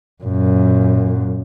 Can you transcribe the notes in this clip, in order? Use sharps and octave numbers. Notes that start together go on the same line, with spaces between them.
F#2 A#2